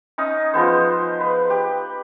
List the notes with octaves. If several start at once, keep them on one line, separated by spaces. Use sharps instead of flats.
C#4 D#4 D#6
F3 G#3 B3 C5
B4
G4